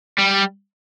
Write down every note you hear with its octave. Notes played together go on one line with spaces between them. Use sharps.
G3